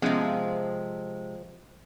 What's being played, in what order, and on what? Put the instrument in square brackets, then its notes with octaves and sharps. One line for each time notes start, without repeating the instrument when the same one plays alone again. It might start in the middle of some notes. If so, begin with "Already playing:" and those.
[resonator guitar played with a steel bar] C3 G#3 [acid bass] F3 [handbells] B3 C#4 E5